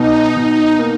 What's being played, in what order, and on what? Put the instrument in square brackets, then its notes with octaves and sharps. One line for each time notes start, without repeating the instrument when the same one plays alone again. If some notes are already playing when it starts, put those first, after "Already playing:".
Already playing: [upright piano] B2 [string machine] D#4
[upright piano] B2 [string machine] D#4
[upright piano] A#3